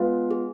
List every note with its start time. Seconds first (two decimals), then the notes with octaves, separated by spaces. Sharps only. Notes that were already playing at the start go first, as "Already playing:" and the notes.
Already playing: G#3 B3 F4 B4
0.31 G#4